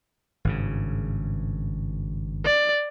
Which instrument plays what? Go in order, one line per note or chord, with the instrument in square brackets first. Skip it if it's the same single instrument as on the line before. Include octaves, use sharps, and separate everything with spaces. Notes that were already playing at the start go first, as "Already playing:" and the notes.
[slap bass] G#1 G2 C#3
[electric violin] D5